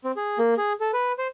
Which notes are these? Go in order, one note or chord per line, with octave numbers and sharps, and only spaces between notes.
C4
G#4
A#3
G#4
A4
B4
C5